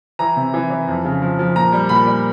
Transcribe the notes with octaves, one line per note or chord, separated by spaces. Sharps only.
E3 A#5
C3
E3
E3
F2
C#3
F3
F3
A#2 A#5
G3
A#2 B5
G3